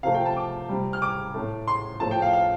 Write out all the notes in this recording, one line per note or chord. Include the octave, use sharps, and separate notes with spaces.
C3 F3 A3 F5
G5
A5
D6
C3 G3
F6
D6
A2 A3
C6
A2 F3 A3 A5
G5
F5
F5